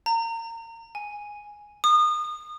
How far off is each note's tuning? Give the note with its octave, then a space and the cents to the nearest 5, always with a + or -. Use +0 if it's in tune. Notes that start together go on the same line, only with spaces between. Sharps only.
A#5 -30
G#5 +0
D#6 -30